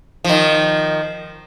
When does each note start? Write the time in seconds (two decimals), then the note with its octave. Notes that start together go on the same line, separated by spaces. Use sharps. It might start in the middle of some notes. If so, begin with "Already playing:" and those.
0.24 D#3 F3